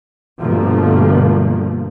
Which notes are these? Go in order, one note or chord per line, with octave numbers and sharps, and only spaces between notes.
G2 B2 D3 F3 A3 A#3